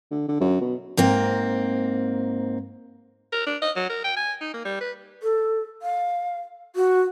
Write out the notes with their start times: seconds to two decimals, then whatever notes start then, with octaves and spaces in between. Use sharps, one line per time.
0.11 D3
0.28 D3
0.40 F#2
0.61 B2
0.97 G#2 A#3 C4
3.32 A#4
3.47 D4
3.62 D#5
3.76 F#3
3.90 A#4
4.04 G5
4.17 G#5
4.41 D#4
4.54 A#3
4.65 G3
4.81 B4
5.23 A4
5.82 F5
6.76 F#4